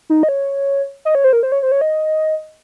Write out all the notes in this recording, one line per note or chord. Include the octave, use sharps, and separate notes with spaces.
D#4
D#5
C#5
D#5
C#5
C5
A#4
C5
C#5
C5
C#5
D#5